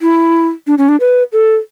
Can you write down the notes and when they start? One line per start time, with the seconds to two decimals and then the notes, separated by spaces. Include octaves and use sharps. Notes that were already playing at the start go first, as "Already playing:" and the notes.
0.01 E4
0.67 D4
0.78 C#4
0.89 D4
1.00 B4
1.33 A4